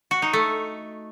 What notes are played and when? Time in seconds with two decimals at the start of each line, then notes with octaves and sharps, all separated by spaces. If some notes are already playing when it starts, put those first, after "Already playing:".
0.11 F#4
0.22 D#4
0.33 A3